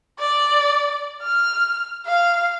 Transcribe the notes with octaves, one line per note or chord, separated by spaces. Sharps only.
D5
F6
F5